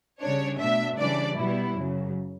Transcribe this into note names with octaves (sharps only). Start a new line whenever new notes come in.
C#3 G3 D4 C#5
B2 A3 D4 E5
C#3 E3 G3 D4 D5
B2 G3 B3 E4
F#2 C#3 F#3